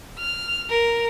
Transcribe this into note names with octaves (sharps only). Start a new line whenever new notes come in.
F6
A#4